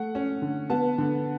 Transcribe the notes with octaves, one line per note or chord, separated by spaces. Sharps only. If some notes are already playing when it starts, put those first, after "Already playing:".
Already playing: A3 F#5
C#4
D3
B3 A5
D3